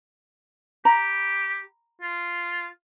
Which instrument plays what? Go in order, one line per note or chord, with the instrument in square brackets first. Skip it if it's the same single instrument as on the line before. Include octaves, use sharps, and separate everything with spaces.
[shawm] G4 [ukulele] A#5 B5
[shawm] F4